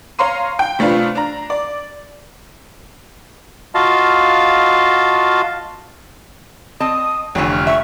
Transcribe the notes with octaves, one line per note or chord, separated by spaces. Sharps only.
C#5 F5 A#5 C6 D#7
G5
C3 A3 D4 F4 B4
D4 A#5
D5
F4 F#4 D#5 F5 A5
C4 D#5 A5 D#6
F1 D3 E3 F3 C#5 G#5
F6
E5 C#6